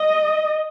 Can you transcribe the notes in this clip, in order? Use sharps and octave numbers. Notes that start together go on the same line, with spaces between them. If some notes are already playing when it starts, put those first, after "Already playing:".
Already playing: D#5